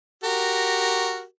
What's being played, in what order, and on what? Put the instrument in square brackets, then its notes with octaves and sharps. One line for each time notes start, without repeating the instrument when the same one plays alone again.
[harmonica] F#4 G4 A#4